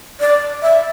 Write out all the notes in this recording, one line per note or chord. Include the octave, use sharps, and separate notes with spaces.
D5
E5